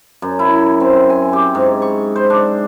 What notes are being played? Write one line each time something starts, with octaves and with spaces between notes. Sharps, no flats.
F#2
E4
C4
G#5
G4
G#2
C#6
C5
D4